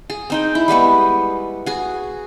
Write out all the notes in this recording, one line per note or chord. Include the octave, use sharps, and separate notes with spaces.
G#4
C4 D#4 G5
E4
G3 G#3 B3 C#6
F#4 G#4